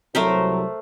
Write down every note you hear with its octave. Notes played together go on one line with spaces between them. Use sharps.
C2 F#3 A3 A#4 C5